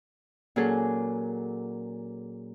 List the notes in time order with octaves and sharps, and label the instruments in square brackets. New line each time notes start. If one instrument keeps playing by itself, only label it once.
[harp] A#2 F#3 C#4 G#4 A4